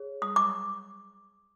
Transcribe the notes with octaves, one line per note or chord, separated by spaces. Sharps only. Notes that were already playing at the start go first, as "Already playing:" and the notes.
Already playing: G#4 C#5
D#6
D6